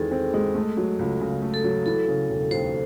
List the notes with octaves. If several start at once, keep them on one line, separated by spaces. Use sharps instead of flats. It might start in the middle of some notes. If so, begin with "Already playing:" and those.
Already playing: E2 D#3 G#3 C4 F#4 G#4 A4
C4
G#3
A3
F#3
C#2
C#3
A3
A4
F#3
E3 A4
C#3
E1
D#2 C5